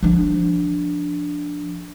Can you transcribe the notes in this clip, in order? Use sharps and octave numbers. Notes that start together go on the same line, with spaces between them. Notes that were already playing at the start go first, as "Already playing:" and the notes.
F3 D4